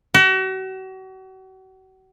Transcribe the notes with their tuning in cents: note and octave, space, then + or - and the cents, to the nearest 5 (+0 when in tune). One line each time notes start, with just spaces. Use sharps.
F#4 +40